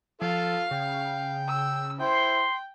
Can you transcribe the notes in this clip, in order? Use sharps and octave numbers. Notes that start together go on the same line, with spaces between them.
F3 F4 A4 F5
C#3 G5
E6
E4 C5 G5 C6